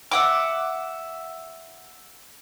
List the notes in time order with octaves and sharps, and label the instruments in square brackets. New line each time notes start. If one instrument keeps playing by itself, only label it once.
[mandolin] E5 F#5 D6